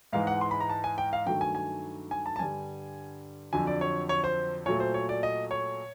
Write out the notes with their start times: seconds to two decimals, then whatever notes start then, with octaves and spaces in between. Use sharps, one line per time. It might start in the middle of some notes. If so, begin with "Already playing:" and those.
0.13 G#2 E3 G#3 F5
0.27 F#5
0.41 C6
0.51 B5
0.60 A#5
0.70 A5
0.84 G#5
0.98 G5
1.13 F5
1.26 G2 D#3 F#3 A3 G5
1.41 G#5
1.55 G#5
2.11 G#5
2.26 A5
2.36 A5
2.39 G2 D3 G3 G#5
3.53 F2 D3 F#3 G#5
3.67 D5
3.81 C#5
4.09 C#5
4.24 C5
4.66 A#2 F#3 A3 C#5
4.80 C5
4.94 C#5
5.09 D5
5.23 D#5
5.51 C#5